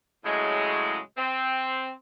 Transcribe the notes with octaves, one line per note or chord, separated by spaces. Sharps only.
A2 C#3 F#3 G#3
C4